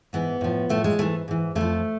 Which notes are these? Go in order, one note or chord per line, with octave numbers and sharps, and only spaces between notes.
G#2 E3 B3
A2 F3
A2 F3 A3
G#3
G#2 E3 A3
G#2 E3
F2 D3 A3
F3